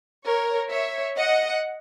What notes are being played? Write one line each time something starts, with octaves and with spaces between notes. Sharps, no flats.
A#4 C#5
C#5 E5
D#5 F#5